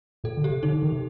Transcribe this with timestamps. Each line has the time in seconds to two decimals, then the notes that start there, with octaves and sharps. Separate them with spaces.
0.24 A#2 A4
0.37 D3
0.44 G4
0.50 C3
0.63 D3 D#4
0.73 D3
0.83 D#3
0.92 C3